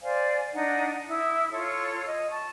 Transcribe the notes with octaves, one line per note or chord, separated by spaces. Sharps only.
C5 D5 F5 G#5
D4 D#4 F#5
E4 D#6
F4 A4 C#5 C6
D#5
A5 C#6